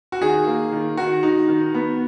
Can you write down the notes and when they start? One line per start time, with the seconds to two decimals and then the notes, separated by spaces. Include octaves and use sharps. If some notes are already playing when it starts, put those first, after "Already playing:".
0.12 F#4
0.21 D#3 G#4
0.47 A#3
0.72 D#3
0.97 D#3 F#4
1.23 D#4
1.48 D#3
1.74 B3